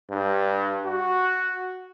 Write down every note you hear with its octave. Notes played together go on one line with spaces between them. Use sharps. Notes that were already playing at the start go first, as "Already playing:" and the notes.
G2
F#4